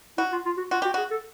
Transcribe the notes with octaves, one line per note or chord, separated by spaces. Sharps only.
E4 F#4
F4
F4
F#4
F4 F#4
F#4 G4
F#4 G#4
A4